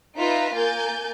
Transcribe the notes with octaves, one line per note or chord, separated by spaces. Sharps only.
D#4 F4 B4 E5 A#5 B6
A#3 A#4 G#5 G6 A6